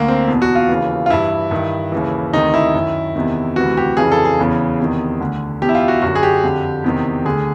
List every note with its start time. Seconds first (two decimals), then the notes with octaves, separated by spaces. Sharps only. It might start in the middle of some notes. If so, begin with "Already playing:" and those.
Already playing: D2 D3 A#3
0.08 C4
0.28 E2 B2
0.42 F#4
0.55 F4
0.69 D#2 C#3 E3
1.06 F4
1.10 G2 E3 E4
1.51 G2 D#3
1.92 D#2 C#3 E3
2.33 D2 C3 D#3 D#4
2.54 E4
2.74 F#2 D#3
3.16 E2 C3 D#3
3.56 D2 C3 E3 F#4
3.77 G4
3.97 F2 C#3 E3 G#4
4.12 A4
4.25 G#4
4.39 E2 C#3 E3
4.80 E2 C3 D#3
5.20 D2 D3
5.62 E2 B2 G4
5.69 E4
5.75 F4
5.88 F#4
6.02 F#2 D3 F#4
6.15 G#4
6.23 G4
6.43 F2 D3
6.84 E2 C3 D#3
7.25 D2 D3 G#4